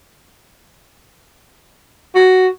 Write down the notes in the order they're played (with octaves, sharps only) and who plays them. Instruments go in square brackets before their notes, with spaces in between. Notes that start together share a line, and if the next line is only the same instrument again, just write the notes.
[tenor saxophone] F#4